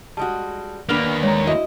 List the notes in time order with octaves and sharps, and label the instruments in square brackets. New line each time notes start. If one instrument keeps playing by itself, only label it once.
[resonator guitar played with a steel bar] G3 G#3 F#4 [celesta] A5
[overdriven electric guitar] D#2 A#3 [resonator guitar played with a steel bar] B3 D4 B4 [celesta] F6 F7
[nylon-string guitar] G#3 [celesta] C#5 A#5
[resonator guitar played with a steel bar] E4 [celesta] F#4 [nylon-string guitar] D#5